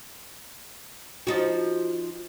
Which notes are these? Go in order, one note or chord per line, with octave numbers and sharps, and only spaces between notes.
F3 D#4 F#4